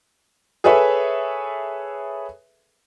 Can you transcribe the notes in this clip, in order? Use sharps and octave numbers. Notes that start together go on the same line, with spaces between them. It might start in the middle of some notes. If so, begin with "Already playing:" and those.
G#4 A4 B4 C#5 E5